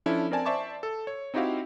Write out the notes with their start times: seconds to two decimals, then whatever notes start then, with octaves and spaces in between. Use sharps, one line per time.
0.06 F3 C#4 D4 E4 A4
0.31 C4 A#4 D5 G#5 A5
0.45 C5 D5 E5 A5 C#6 D6
0.83 A4
1.07 C#5
1.34 C4 D#4 E4 F#4 G4 F5